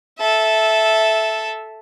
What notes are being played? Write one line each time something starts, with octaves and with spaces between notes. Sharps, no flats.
A4 E5